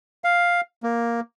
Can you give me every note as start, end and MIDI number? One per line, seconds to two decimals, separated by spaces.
0.24 0.61 77
0.83 1.20 58